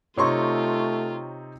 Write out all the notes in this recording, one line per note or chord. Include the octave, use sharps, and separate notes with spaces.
C3 A3 C4 D#4 F4 C#5 C6 C#6